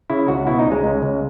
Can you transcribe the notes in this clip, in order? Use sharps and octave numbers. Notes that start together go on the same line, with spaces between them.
C#3 E4
C#2 F#4
B2 E4
D#4
C#2
G#3
C#2
C#2